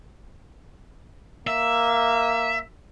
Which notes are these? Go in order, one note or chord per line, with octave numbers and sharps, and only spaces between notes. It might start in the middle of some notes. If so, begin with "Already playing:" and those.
A#3 E5